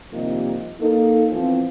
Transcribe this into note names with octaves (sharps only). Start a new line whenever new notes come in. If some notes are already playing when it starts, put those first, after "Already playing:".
C3 D#3 F3 G3 A#3 D#4
A#3 D#4 A4
E3 F3 B3 C4